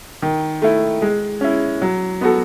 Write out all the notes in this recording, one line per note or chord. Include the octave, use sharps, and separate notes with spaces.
D#3
A3 E4
G#3
C#4 E4
F#3
B3 F#4 A4